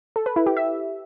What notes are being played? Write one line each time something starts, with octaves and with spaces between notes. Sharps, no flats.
A4
B4
E4
G4
E5